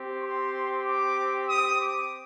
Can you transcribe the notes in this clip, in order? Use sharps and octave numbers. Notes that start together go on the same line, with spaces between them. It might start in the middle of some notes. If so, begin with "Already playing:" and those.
Already playing: C4 G4
C6
D6
D#6
D6